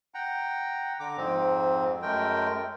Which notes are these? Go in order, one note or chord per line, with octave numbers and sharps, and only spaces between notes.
F#5 G5 A#5
D3 A#5 D6
F2 G#2 C4
F#2 G#3 A3 A#4 G5